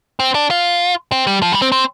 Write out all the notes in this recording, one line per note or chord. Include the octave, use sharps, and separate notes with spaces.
C4
D4
F4
C4
G3
F3
G3
C4
C4